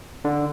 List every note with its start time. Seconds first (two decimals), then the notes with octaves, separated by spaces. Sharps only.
0.25 D3